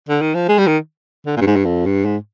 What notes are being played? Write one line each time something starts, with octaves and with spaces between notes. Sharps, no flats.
D3
D#3
F3
G#3
G3
D#3
D3
A#2
G2
G#2
G2
F2
G2
G#2